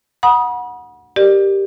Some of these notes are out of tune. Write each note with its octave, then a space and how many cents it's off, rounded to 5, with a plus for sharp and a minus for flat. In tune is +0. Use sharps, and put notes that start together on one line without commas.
F#5 -15 B5 -40 D#6 +0
G4 +0 A#4 +0 D5 +25